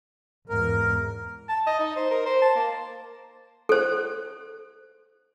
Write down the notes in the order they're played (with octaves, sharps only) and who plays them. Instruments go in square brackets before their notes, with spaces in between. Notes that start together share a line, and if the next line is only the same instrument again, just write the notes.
[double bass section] E2 G#2 [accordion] A#4
[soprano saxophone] A5
D#5
D#4
C5
A#4
C5
A5
A#3
[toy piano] A4 C5